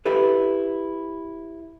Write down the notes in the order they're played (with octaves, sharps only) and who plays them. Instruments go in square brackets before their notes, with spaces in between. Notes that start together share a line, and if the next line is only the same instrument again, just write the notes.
[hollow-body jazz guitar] E4 G4 A4 B4